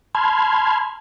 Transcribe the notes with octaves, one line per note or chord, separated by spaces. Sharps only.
A5 B5 C6 F6 G#6